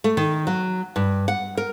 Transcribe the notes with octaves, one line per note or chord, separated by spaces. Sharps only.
A3
D#3
F#3
G2
F#5
A#4